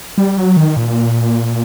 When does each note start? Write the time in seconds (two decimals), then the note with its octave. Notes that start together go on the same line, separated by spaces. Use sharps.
0.18 G3
0.38 F#3
0.57 D#3
0.77 A#2